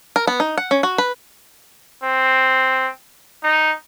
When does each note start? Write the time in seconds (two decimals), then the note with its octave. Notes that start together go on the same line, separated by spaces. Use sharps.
0.16 A#4
0.27 B3
0.40 D#4
0.57 F#5
0.71 C#4
0.83 F#4
0.98 B4
2.04 C4
3.44 D#4